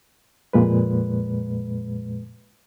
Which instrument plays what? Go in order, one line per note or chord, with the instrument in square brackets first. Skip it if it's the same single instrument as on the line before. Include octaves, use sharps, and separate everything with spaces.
[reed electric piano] F2 A#2 G#3 B4